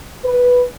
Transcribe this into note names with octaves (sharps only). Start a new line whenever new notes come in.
B4